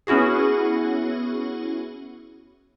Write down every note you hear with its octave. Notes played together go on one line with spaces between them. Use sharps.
B3 C#4 E4 F#4 G#4